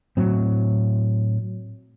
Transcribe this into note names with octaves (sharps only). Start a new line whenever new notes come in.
A2 F#3 C4